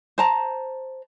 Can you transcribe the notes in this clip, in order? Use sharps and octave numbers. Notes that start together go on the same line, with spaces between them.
C5 A5 A#5